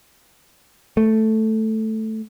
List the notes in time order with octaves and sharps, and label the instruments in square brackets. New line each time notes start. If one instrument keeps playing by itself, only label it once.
[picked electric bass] A3